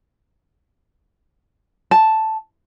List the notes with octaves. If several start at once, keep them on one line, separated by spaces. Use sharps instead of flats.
A5